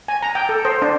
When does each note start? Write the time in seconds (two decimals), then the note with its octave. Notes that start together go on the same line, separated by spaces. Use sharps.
0.08 G#5
0.22 A#5
0.35 G5
0.49 A4
0.65 C5
0.82 D4